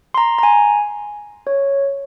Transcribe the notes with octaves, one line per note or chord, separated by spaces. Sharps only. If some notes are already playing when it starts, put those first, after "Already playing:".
C6
A#5
A#5
G#5
C#5